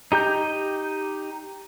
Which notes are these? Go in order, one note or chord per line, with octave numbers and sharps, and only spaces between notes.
D#4 G4 A#5 G6